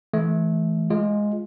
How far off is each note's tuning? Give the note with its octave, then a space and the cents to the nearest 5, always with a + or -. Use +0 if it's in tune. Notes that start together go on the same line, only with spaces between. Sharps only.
E3 +0 A3 -25
G#3 +0 F4 +0